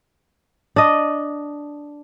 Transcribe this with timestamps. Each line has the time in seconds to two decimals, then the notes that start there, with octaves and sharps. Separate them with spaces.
0.76 D4 D#5